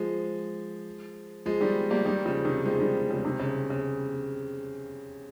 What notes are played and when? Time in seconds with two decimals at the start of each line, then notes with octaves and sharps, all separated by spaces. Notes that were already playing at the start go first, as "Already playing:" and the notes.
Already playing: F3 G#3
1.46 F3 G#3
1.61 D#3 G3
1.90 G3 A#3
2.05 D#3 G3
2.25 C#3 F3
2.45 C3 D#3
2.66 F3 G#3
2.80 D#3 G3
3.10 C#3 F3
3.25 C3 D#3
3.40 C#3
3.70 C#3